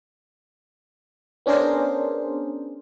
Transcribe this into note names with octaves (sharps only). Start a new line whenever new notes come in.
B3 C#4 D4 G#4 A#4 C5